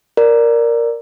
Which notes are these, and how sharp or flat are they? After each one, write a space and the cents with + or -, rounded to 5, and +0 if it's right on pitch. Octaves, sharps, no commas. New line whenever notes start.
A#4 +0 D5 +0